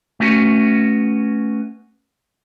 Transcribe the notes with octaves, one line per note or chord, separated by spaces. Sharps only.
A3 B3 C#4 F#4